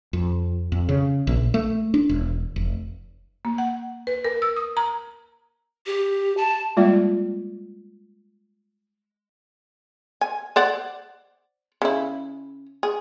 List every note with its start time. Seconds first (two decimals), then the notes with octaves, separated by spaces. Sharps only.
0.13 F2
0.72 F2
0.89 C#3
1.27 A#1
1.54 A3
1.94 D4
2.09 E1
2.56 F1
3.45 A#3
3.58 F#5
4.07 B4
4.25 A#4
4.42 E6
4.56 D#6
4.77 A#5
5.87 G4
6.37 A5
6.77 G3 G#3 A#3 F4 D5
10.21 G#5
10.56 C5 D5 F#5
11.82 C#3 E4
12.83 G#4